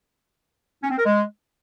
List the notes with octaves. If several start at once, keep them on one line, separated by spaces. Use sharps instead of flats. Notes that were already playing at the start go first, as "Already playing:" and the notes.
C#4
C4
A#4
G#3